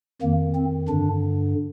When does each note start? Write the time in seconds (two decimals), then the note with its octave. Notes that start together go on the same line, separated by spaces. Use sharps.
0.22 F2 D#3 A#3
0.55 C4
0.88 G2 D3 D4